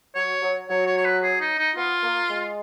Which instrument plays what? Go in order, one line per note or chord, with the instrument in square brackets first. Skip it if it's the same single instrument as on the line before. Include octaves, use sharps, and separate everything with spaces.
[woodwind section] F#3 [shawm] C#5
[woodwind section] F#3
[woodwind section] F#3 [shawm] C#5
[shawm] C#5
C#5
B4
G#4
D#4
D#4
[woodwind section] B3 [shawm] F4
[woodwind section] A#3
G#3